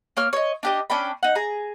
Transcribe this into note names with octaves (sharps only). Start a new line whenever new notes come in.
A#3 C#5 F6
C#5 D#5
D4 G4 D#5
C#4 D4 G5 B5
D#4 F#5
G#4 A#5